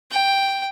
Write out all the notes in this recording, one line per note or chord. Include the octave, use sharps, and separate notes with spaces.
G5